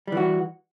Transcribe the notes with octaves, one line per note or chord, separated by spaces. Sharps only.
E3 G3 F#4